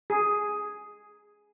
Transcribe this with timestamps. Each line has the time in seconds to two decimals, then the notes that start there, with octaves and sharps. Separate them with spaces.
0.10 G#4